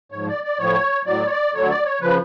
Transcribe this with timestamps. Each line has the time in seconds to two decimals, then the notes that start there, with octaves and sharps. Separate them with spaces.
0.12 G#2 F3 C#5
0.28 D5
0.44 D5
0.59 A2 F3 C#5
1.06 A2 F#3 D5
1.26 C#5
1.30 D5
1.54 D2 D3 F#3 C#5
1.70 D5
1.85 C#5
2.01 C#3 F3 B4